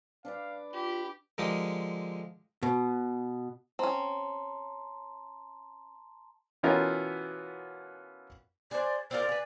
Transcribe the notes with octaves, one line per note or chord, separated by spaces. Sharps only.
D4 B4 D5 F5
F4 G4 B5
D3 F3 G#3 G4 A#4
B2
C4 C#4 A5 A#5 C6
B2 E3 B3 C#4 F4 A#4
G#4 C5 D5
C4 F4 A#4 D5
G#4 B4